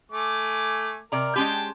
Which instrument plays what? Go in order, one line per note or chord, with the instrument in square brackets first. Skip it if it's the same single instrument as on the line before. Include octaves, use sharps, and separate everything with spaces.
[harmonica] A3 G#5 D6
[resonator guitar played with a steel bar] C3 D5 A#5 [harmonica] A#4
[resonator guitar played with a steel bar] G#3 C#4 G4 [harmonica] G5 A5 C6